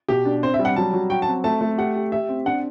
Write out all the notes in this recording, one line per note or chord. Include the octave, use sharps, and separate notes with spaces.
B2 G4
D4
C4 C5
E5
G3
F#5
F#3 A5
F#3
F#4 G5
A5
C4
A3 A5
A3
G4 F#5
G4
G4 E5
C4
D4 F#5